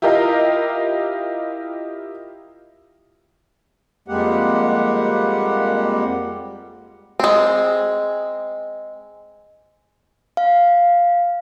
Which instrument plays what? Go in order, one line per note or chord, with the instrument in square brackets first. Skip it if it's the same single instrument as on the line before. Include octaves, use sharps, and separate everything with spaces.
[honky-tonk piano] E4 F4 G4 A#4 D#5 F5
[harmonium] F2 G3 G#3 A#3 G4 F#5
[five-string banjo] G#3 C4
[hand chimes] F5